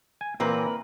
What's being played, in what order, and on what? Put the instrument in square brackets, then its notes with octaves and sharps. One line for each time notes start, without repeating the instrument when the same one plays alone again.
[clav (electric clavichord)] G#5
[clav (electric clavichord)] A#2 E3 C4 [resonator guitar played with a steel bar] A#3 A#4 B4